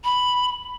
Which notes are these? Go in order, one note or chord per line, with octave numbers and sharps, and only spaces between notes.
B5